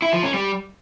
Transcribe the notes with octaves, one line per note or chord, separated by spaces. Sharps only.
E4
F3
C#4
G3